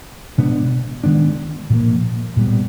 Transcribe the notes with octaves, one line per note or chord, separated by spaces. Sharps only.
B2 G#3 B3 D4
D#3 G#3 B3 D4
A#2 F3 A#3
A#2 G3 B3